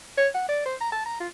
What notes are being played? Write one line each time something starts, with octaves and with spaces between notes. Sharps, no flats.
C#5
F#5
D5
C5
A#5
A5
A#5
F4